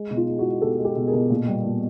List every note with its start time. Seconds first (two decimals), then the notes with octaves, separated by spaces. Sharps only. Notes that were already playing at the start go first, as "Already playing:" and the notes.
Already playing: G#3
0.10 B2
0.16 D#4 F4
0.28 G#3
0.39 E4 F#4
0.44 G#3
0.61 B2 G4 A4
0.79 G#3
0.85 G4 A4
0.96 B2
1.07 G#4 A#4
1.13 B2
1.30 A#2
1.48 G3
1.64 A#2